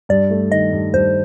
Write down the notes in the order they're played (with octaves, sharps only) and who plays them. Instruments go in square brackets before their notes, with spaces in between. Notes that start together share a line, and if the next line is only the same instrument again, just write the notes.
[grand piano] G2 [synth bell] D5
[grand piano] A3
[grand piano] D#3 [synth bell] D#5
[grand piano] G2
[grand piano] G2 [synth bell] C5